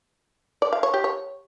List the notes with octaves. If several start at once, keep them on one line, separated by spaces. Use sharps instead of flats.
D5
F5
C#5
G4
C#5